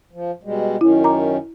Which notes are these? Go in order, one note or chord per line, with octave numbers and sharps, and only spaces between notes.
F3
B2 G3 G#3
F#2 D#3 C#4 E4
A#5 D6